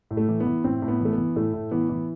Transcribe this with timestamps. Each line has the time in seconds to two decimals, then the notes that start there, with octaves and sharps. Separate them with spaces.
0.11 A2
0.17 A3
0.28 E3
0.40 B3
0.46 E3
0.64 A2 C4
0.82 A2
0.88 B3
1.00 E3 A3
1.12 B3
1.18 E3
1.36 A2 A3
1.54 A2
1.71 E3 B3
1.89 E3